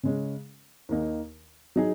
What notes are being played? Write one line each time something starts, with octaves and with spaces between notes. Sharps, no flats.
C#3 G#3 C#4
D#2 D#3 A#3 D#4
F#3 D#4 G#4